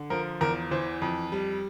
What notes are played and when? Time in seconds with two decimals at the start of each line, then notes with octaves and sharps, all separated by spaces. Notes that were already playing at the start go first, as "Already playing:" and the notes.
Already playing: D3
0.10 F3 A#4
0.41 E2 A#4
0.71 E3 C5
1.02 F2
1.32 G3